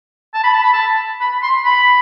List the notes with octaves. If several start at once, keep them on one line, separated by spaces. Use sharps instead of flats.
A5
B5
A5
B5
A5
B5
C6
B5